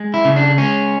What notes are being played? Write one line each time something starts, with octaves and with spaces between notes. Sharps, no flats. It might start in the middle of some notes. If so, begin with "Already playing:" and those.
Already playing: G#3
E4
C#3
D4
G#3 C#4